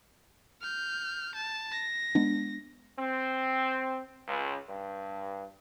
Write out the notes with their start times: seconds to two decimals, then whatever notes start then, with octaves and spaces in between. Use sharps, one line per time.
0.62 F6 G6
1.35 A5
1.72 A#6
2.15 G#3 B3 D4
2.99 C4
4.28 C#2
4.69 G2